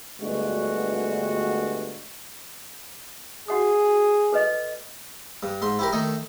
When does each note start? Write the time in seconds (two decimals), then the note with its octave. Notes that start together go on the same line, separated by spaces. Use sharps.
0.20 G1 D2 G2 G#3 F#4
3.48 F#4 G#4 F#5 D#6
4.33 A4 B4 D#5
5.43 G2
5.62 G#2 C6
5.79 E4 G4 A#4
5.93 D#3 A3 D#4 D#5